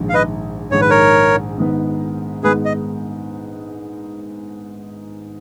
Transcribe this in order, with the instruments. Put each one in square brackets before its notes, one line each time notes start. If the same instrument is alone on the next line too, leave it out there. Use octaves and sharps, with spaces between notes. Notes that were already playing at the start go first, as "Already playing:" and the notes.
Already playing: [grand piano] A#1 G#2 D#3
[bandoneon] F5
B4 D#5
[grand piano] A#1 G#2 D#3 [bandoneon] C#5
[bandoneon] B4
A#4 C#5
[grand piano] G#2 D#3 G#3 B3
[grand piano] G#2 D#3 G#3 B3 [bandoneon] G#4 B4
[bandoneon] D#5